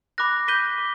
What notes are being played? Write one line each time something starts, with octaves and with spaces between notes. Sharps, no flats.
B5 D6 F#6 A#6
D6 G6 B6 D#7 G7
D6